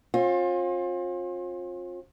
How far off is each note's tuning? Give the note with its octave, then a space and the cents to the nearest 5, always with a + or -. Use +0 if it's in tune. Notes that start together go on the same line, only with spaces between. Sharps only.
C4 +45 F4 +30